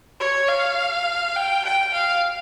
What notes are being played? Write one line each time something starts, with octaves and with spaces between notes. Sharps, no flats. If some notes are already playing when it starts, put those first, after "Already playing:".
C#5
F5
G5
G5
F5